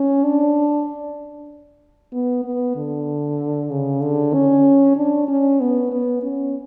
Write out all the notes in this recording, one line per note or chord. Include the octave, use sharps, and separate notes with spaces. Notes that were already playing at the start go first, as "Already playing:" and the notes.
Already playing: C#4
D4
B3
B3
D3
C#3
D3
C#4
D4
C#4
B3
B3
C#4